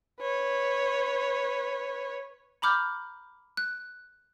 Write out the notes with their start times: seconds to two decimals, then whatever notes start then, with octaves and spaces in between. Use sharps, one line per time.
0.21 B4 C#5
2.62 A#5 B5 D6 F6 G6
3.57 F#6